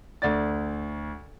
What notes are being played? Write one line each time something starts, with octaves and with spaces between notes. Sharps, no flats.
D2 D5 A6